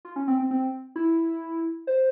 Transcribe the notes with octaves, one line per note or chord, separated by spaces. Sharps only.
F4
C#4
C4
C4
C4
E4
C5